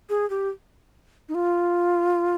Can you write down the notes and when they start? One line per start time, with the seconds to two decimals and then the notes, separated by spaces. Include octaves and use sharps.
0.09 G#4
0.30 G4
1.29 D#4
1.35 F4